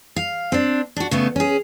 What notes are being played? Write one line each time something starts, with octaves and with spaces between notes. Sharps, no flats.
F5
C4 D4
D4 F#4
C#3 A3 B3
C#4 G#4